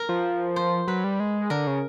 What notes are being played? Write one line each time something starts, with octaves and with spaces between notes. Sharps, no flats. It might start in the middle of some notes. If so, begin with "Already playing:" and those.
Already playing: A#4
F3
C5
F#3 B4
G3
G#3
D3 A#4
C#3